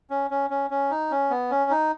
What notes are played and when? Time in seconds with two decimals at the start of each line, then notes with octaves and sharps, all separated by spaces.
0.10 C#4
0.30 C#4
0.50 C#4
0.70 C#4
0.91 D#4
1.11 C#4
1.30 B3
1.51 C#4
1.70 D#4